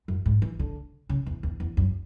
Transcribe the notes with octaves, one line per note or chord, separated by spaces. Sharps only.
F#2
G#2
E3
D3
C#3
E2
E2
E2
F#2